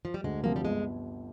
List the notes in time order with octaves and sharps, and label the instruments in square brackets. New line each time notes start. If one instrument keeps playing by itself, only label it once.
[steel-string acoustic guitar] F3
G3
[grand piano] D2 [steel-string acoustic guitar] G#3
[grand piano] C3 F3 C4 F4 [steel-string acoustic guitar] A#3
[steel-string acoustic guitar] G3
[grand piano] G1 [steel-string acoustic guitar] G#3